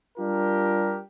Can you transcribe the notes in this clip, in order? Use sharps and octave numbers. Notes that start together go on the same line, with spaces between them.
G3 D4 F4 G4 A#4